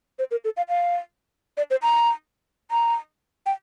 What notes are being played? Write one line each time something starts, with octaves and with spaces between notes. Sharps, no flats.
C5
A#4
A4
F5
F5
D5
C5
A#5
A#5
G5